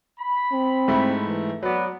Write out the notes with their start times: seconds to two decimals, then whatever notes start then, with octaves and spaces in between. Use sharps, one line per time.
0.20 B5
0.53 C4
0.88 G#2 A3 E4
1.26 E3
1.63 F#3 B3 F#4 D5